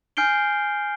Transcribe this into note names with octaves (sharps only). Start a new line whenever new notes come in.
G#5 F6 G6 C7 D7 G7